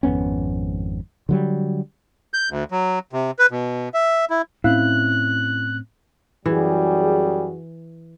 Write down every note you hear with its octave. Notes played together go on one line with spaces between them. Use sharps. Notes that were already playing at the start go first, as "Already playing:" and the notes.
G#1 F2 B3 C#4
D3 F#3 G3
G6
D2
F#3
C3
B4
B2
E5
E4
A2 C4 C#4 E4 F5 F#6
F#2 E3 G3 F#4 G#4